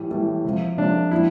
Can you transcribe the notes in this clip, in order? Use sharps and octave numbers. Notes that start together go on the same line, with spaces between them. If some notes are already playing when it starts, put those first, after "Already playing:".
Already playing: A2 E3 G3
A2 E3 G3
C3 F3
C3 F3 D4
A2 F3 E4